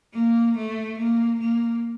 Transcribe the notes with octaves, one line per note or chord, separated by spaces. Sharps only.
A#3
A3
A#3
A#3